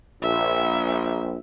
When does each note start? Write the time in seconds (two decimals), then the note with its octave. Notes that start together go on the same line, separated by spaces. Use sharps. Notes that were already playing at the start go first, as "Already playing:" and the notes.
0.22 A#1 E5